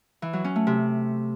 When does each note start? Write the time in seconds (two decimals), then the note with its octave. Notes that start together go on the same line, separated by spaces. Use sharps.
0.22 E3
0.33 F#3
0.44 C#4
0.56 A3
0.67 C3